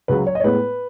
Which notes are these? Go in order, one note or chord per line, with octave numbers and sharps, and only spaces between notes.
C#2 C#3 F#3 B4
C#5
D#5
C#5
A2 G#3 B3 B4